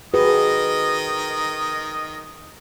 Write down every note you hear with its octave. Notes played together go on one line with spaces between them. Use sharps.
D#3 F#4 G#4 B4 D#5